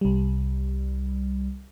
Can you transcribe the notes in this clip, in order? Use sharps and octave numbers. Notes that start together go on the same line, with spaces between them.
C2 G3